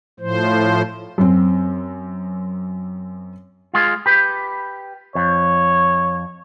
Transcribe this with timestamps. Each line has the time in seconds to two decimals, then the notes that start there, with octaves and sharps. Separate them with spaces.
0.20 A2 F3 C5
1.18 F#2 C4
3.74 G#3 F4
4.06 G4 B4
5.15 F2 C#5